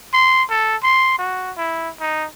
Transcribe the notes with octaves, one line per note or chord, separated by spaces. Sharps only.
C6
A4
C6
F#4
E4
D#4